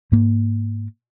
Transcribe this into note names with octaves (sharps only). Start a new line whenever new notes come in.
G#2 A#3